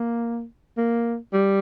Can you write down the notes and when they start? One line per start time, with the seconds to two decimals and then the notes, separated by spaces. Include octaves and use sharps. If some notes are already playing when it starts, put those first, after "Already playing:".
Already playing: A#3
0.77 A#3
1.33 G3